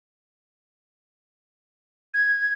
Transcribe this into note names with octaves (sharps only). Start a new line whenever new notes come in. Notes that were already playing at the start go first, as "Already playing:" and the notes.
G#6